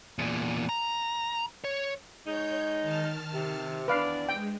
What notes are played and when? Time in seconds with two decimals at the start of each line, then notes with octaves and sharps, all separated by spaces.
0.19 E2 A#2
0.69 A#5
1.64 C#5
2.26 G#3 D#4 C#5 G6
2.82 D#3 A5 F6
3.33 C3
3.88 E2 D4 B4 D5 F5
4.29 G#3 G5